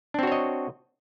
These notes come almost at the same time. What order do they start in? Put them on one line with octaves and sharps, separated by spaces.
D4 C4 F#4 C#5 D#5